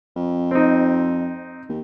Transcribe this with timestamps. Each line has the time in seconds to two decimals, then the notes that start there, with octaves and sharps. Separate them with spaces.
0.16 F2
0.51 C4 D#4
1.69 D#2